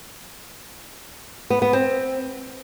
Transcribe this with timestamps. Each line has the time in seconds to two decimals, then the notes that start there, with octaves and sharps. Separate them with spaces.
1.50 B3
1.62 B3
1.73 C4